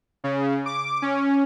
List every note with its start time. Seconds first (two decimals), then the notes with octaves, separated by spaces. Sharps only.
0.24 C#3
0.66 D6
1.02 C#4